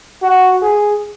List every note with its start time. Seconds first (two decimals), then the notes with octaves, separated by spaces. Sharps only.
0.22 F#4
0.62 G#4